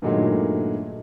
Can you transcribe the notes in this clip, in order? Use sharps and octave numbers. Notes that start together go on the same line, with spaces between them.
G2 A#2 D#3 F#3 G#3 A3